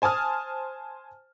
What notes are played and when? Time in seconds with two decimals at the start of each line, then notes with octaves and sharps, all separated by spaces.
0.02 C5 G#5 A5 D#6 F6